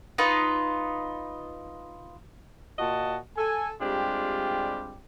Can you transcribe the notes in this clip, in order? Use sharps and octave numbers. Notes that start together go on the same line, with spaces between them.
D#4 F4 B4
A#2 F4 F#4 D#5 F#5 A5
A4 G#5
G3 G#3 C4 D4 F4 G4